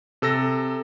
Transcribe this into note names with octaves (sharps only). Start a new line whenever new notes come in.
C3 A4 E6 A#6